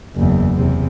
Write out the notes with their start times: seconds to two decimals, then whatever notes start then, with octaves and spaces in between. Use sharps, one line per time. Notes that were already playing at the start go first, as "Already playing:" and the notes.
0.15 F#1 E2
0.55 E2 C3